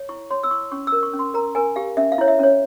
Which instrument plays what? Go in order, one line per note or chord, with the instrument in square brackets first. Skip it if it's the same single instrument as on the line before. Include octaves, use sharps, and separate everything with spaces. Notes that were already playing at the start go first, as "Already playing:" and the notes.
Already playing: [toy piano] C#5
E4 C#6
C#5 C6
E6
E4 C#6
C#4 C#6
E6
A#4
C#6
C#4
C6
A#4 A#5
A#4 G#5
G4 F5
C#4 E5
F5
E4 C#5
E5
C#4 C#5